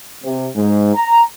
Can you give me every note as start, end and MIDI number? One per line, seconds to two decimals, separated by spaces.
0.24 0.48 48
0.56 0.95 44
0.95 1.22 82